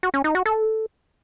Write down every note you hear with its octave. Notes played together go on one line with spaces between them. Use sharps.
F#4
C#4
D#4
F#4
A4